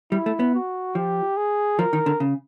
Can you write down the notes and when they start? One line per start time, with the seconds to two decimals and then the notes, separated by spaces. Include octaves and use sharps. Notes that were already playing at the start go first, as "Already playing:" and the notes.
0.11 G3 E4
0.26 A3
0.40 B3
0.54 F#4
0.95 F3 G4
1.37 G#4
1.79 F3 A#4
1.93 D#3
2.06 D3
2.20 C#3